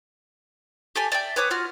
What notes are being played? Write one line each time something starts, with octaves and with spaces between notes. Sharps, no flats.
G4 A4 G#5
D5 E5 G5
B4 C#5 D6 D#6
F4 F#4 F6